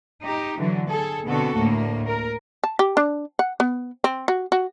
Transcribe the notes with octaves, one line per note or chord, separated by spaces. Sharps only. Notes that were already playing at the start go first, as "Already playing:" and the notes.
D#4 G4
D3 E3 F#3
G#4 A4
B2 D3 B3 C4 F#4 A4
D2 A2 A3 A#3
A#4
A5
G4
D4
F#5
B3
C4
F#4
F#4